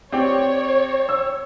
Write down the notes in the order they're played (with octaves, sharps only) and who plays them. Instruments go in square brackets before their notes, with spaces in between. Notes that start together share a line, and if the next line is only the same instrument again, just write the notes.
[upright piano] C4 G4 D5 [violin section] C#5
[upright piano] E6